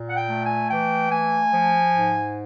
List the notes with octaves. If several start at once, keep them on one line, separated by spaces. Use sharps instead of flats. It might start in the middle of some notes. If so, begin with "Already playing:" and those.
Already playing: A#2
F#5
G5
A3
G#5
E3 G5
A3 G#5
F3
G#2